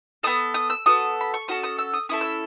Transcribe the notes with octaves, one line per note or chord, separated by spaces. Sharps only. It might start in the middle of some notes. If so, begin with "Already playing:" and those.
B3 D#4 A4 D#6
D#6
E6
B3 F#4 A4 D#6
B5
C#6
C#4 F#4 A4 D#6
D#6
E6
D#6
C#4 E4 A4 D#6
E6